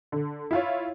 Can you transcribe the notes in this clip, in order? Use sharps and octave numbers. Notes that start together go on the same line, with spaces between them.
D3
E4 F4 C#5